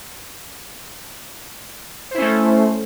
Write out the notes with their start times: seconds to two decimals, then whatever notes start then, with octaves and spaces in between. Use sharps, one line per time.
2.11 C5
2.14 E4
2.18 C#4
2.21 A3